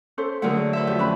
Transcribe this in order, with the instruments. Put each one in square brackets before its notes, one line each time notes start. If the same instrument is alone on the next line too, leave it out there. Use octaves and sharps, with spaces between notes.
[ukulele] C#4 A4 C5
[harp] D3 F#3 A3 [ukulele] G#4 A#4 F#5
[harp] B4 C5 E5
[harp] F2 [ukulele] G4 G#4
[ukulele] C#4 B4 B5